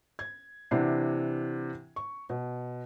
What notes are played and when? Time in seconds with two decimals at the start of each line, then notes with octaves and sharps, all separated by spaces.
0.19 G#6
0.71 C3 E3 D4 E4 F#5 C7
1.96 C#6
2.30 B2